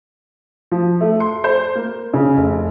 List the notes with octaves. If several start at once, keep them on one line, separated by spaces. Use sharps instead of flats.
F3
A3
C6
C5
A#3
C#3
F1